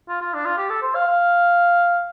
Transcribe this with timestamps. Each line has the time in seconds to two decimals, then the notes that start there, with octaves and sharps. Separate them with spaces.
0.09 F4
0.21 F4
0.34 D4
0.45 F4
0.57 G4
0.70 A4
0.82 C5
0.95 F5
1.07 F5